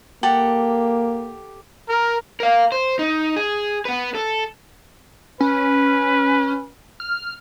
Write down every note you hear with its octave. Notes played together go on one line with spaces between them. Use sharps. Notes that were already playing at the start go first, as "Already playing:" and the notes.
A#3 G4 A4 F#5
A#4
A#4 F5
C5
D#4
G#4
B3 B4
A4
C#4 B4
F6